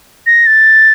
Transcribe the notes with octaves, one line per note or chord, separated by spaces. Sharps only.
A#6
A6